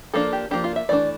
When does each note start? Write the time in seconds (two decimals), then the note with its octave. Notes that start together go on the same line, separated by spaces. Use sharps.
0.14 F3 A#3 D4 A4
0.33 G4
0.51 F3 A#3 D4 G4
0.64 F4
0.76 E5
0.89 E3 A3 D4 D5